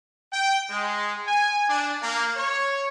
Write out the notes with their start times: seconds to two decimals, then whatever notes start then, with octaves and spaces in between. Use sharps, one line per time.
0.31 G5
0.70 G#3
1.28 G#5
1.69 D4
2.02 A#3
2.37 C#5